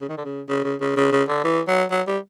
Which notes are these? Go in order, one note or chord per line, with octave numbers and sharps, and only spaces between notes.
C#3
D#3
D3
C#3
C#3
C#3
C#3
C#3
C#3
D3
E3
F#3
F#3
G3